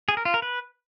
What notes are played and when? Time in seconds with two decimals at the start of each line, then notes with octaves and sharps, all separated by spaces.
0.09 G#4
0.17 A#4
0.25 F4
0.34 A#4
0.42 B4